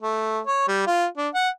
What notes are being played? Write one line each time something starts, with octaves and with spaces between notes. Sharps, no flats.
A3
C#5
G3
F4
D4
F#5